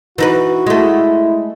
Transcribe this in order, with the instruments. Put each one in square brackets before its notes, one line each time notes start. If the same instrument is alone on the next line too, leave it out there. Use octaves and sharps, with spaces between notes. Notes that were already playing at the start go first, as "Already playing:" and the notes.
[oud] E3 D#4 B4 [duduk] F#4
[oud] G#3 A3 [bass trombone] E4